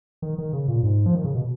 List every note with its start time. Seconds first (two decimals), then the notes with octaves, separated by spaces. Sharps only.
0.22 D#3
0.38 D#3
0.53 C#3
0.68 A#2
0.83 G#2
1.06 F3
1.15 D#3
1.24 C#3
1.35 B2